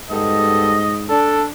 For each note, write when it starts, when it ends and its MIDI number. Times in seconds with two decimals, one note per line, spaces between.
0.11 1.15 44
0.11 0.83 55
0.11 0.83 59
0.11 0.83 69
0.11 1.04 75
1.10 1.52 62
1.10 1.43 69